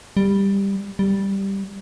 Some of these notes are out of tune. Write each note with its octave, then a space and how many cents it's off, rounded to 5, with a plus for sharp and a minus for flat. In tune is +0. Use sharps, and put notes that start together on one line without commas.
G3 +10
G3 +0